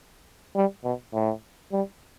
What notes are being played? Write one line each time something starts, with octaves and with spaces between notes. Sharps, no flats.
G3
B2
A2
G3